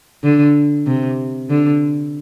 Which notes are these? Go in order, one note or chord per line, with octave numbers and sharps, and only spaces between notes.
D3
C3
D3